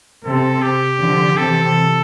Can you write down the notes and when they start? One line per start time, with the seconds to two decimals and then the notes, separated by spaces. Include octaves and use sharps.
0.24 C3 A4
0.62 G4
0.99 D3 F3
1.37 C3 E3 A4